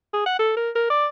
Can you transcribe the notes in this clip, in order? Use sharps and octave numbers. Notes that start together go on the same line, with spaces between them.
G#4
F#5
A4
A#4
A#4
D5